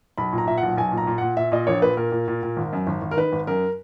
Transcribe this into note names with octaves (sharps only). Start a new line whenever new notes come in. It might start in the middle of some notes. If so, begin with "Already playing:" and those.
B1 B5
A#2
A#5
A#2 E5
F#5
B1
B1 G#5
A#2
A#5
A#2
A#2 F#5
A#2 E5
A#2 D#5
A#1 C#5
A#2 B4
A#2 A#4
A#2
A#2
A#2
G#1
F#2
G#1
G#1
A#4
D#3 B4
G#1
F#2 A#4